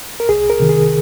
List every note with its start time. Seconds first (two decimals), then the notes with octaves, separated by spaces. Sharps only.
0.20 A#4
0.29 C2 G#4
0.50 A#4
0.60 C3 D#3
0.69 G#4